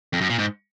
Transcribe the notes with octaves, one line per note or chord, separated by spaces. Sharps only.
F2
F#2
A#2
G#2